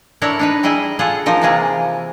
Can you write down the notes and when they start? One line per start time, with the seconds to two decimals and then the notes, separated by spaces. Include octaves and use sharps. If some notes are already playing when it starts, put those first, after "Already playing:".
0.22 D4 E4 A4 A#4 C#5 D5
0.39 D4 D#4 B4
0.63 G3 E4 G#4 D#5 E5
0.99 F4 G#4 A4 F#5
1.26 F3 D#4 A#4
1.41 C3 E3 G#3 A#3 F4 G#4